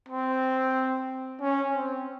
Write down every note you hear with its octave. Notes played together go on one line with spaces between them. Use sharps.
C4
C#4
C4